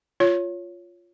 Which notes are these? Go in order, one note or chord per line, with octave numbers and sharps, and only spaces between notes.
F4 C#5